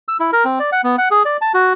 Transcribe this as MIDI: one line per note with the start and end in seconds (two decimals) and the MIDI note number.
0.08 0.17 88
0.20 0.31 64
0.33 0.45 70
0.45 0.59 60
0.60 0.70 74
0.72 0.81 78
0.84 0.96 59
0.98 1.09 78
1.11 1.23 68
1.25 1.37 74
1.41 1.52 81
1.54 1.73 66